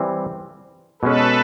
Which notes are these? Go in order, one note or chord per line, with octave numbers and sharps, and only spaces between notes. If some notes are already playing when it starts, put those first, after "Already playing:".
Already playing: E3 G3 C4
B2 G#3 C#4 A4 B4